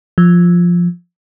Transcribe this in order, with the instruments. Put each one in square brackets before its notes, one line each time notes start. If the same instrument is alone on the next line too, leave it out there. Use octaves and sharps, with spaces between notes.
[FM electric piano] F3